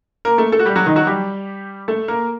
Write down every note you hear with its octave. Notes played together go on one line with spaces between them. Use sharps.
A#3 A#4
A3 A4
A3 A4
F#4
G3 G4
F#3 F#4
D#3 D#4
F#3 F#4
G3 G4
A3 A4
A#3 A#4